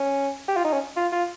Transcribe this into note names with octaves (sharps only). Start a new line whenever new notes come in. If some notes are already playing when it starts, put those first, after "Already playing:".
Already playing: C#4
G4
F4
D#4
C#4
F4
F4